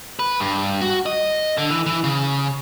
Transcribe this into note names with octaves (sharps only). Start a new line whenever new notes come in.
B4
G2
F#4
D#5
D3
E3
E3
C#3